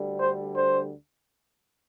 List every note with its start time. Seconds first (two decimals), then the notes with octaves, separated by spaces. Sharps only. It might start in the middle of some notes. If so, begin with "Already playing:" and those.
Already playing: D2 D3 G3
0.18 C5
0.55 C5